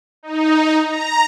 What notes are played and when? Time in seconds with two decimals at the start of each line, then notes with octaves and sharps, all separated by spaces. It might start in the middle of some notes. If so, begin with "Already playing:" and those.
0.23 D#4
0.86 A#5